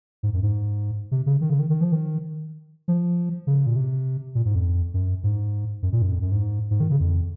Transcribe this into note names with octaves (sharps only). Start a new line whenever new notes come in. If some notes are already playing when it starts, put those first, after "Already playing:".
G#2
F#2
G#2
C3
C#3
D#3
C#3
D#3
D#3
F3
D#3
F3
C#3
A#2
C3
A#2
G#2
F2
F#2
G#2
F#2
A#2
F#2
F2
F#2
G#2
G#2
D#3
C#3
F2